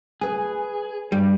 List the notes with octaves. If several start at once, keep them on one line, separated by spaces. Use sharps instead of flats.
G#4 B4 G#5
G2 G3